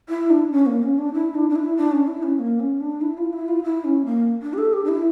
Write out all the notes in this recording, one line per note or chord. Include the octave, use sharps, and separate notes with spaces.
E4
D4
C#4
A#3
C#4
D4
E4
D4
D4
E4
D4
C#4
E4
C#4
A#3
C#4
D4
E4
F4
E4
F4
E4
C#4
A#3
D4
G4
A4
G4
D4
E4